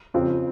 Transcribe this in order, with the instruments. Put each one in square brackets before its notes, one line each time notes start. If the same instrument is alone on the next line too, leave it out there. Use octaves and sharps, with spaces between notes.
[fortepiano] F2 C#3 F3 C4